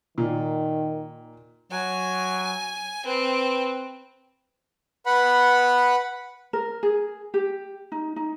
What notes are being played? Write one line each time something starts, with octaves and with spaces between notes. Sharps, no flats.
A#2 D#3
F#3 G#5
C4 B4
B4 F#5 B5
A#4
G#4
G4
D#4
D#4